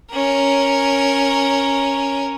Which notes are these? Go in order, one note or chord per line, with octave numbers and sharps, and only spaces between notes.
C#4 A#4